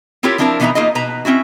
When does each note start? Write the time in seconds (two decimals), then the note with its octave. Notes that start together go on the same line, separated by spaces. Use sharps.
0.23 C4 E4 F4 G4 A#4 C#5
0.38 F3 C4 D4 E4 G#4 A#4
0.60 B2 E3 B3 D#4 E5 A#5
0.75 A#3 D#4 F4 G#4 D#5
0.95 B2 B4 A#5
1.25 C4 C#4 E4 F#4